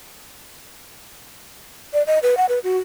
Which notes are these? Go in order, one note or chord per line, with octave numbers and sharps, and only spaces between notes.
D5
D#5
B4
F#5
B4
F#4